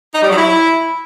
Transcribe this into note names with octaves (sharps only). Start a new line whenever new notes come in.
D#4
G3
F#3
E4